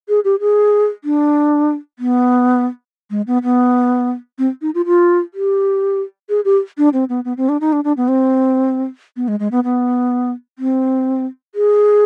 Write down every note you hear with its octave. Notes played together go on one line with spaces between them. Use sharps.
G#4
G4
G#4
D4
B3
G#3
B3
B3
C4
D#4
F4
F4
G4
G#4
G4
D4
C4
B3
B3
C4
D4
D#4
D4
D4
B3
C4
B3
G#3
G#3
B3
B3
C4
G#4